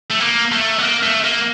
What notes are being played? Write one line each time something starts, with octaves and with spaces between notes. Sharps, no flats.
A3
A#3
A3
B3
A#3
A3
A#3